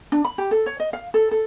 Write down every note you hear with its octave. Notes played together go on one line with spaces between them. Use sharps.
D4
B5
G4
A4
C#5
D#5
F5
A4
A4